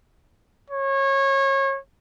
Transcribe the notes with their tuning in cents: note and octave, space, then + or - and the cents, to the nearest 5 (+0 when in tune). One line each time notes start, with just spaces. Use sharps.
C#5 -25